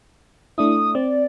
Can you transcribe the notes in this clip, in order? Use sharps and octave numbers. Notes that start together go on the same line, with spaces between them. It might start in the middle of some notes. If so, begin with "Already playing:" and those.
A3 D4 E4 D#6
C4 D5